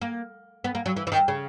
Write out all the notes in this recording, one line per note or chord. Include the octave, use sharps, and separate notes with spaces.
A#3
B3
A#3
F#3
E3
E3
D#3
C#3